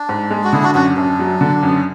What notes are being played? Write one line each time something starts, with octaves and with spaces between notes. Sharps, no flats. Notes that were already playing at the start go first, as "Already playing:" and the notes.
Already playing: D4
G#2
G#3
F#4
D3 E4 G#4
D4 F#4
F#2 D4 F#4
D4
F#2 D4
F#3
D3
F#2 B3
C#4